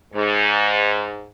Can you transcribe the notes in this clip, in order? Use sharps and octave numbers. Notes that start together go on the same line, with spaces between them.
G#2